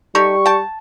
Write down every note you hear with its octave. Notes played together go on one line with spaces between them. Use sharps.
G3 D#4 G4 A4 C#6
G5 A5